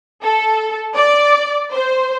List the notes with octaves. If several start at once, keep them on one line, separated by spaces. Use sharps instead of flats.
A4
D5
C5